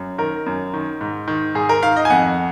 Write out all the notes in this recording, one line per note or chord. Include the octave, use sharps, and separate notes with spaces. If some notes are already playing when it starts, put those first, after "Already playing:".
Already playing: F#2
D#3 A#4
F#2
D#3
G#2
D#3
G#2 G#4
A#4
D#3 F5
D#5
G#5
F2 F#5